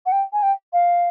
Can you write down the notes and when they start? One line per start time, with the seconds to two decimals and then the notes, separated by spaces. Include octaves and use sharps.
0.06 F#5
0.12 G5
0.33 G#5
0.43 G5
0.73 F5